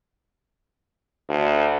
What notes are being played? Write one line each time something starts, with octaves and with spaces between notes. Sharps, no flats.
D2